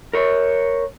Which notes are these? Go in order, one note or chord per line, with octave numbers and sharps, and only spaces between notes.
A#4 C#5